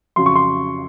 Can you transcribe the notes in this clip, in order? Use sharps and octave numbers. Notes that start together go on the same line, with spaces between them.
F2 C#3 F#3 C6
C#6
C6